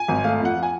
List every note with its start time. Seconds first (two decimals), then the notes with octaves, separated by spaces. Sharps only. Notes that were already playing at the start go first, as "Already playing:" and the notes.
Already playing: G#5
0.08 G#1
0.24 A3 F5
0.40 F2 F#5
0.56 F3
0.63 G#5